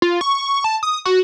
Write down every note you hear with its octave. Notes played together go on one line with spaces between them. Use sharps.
F4
C#6
A5
D#6
F#4